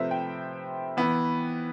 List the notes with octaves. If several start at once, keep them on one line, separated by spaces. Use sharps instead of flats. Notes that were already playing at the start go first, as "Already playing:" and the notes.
Already playing: C3 F3 A3 B4 C5 E5
G5
E3 B3